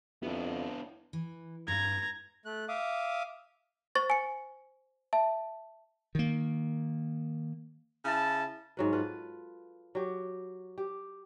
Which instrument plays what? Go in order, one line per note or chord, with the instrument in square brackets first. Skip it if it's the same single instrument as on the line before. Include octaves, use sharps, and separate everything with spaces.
[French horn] F2 [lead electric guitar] B3 D4 [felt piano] E4
[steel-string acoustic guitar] E3
[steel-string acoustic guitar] G2 [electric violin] A#5 G#6
[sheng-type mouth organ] A3 F#6
E5 F5 D6 D#6
[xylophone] C5 C#6 A6
G#5 C#7
E5 A5
[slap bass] D#3 A#3
[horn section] C#3 E4 A5
[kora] G#2 F#3 B4
F4 A4 B4
F#3 G4
G4